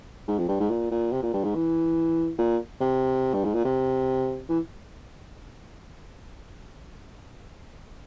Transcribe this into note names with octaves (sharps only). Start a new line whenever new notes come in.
G#2
F2
G2
G#2
A#2
A#2
C3
A#2
G2
G#2
E3
A#2
C3
G2
G#2
A#2
C3
E3